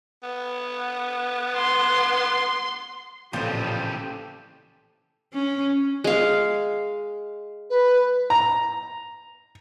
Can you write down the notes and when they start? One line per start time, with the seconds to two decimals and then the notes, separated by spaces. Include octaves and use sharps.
0.23 B3
1.56 C6
3.33 A1 A#2 C#3 E3 F3 C4 G4 A4
5.33 C#4
6.04 G#3 F5
7.70 B4
8.30 A#5